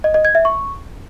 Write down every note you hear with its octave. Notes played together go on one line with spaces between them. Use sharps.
D#5
D#5
G#6
E5
C#6